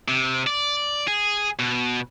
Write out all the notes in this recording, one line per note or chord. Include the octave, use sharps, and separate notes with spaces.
C3
D5
G#4
B2